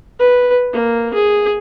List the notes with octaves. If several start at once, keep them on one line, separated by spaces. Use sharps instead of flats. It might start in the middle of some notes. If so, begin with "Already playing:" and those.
B4
A#3
G#4